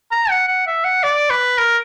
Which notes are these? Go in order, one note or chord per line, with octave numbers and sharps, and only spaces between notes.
A#5
F#5
F#5
E5
F#5
D5
B4
A#4